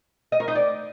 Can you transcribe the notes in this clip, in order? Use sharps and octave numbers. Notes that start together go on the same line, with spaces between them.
D#5
A#4
D#4
D5